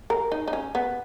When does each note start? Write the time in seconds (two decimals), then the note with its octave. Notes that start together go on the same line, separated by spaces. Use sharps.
0.10 A#4
0.32 D#4
0.48 D#4
0.53 C#4
0.75 B3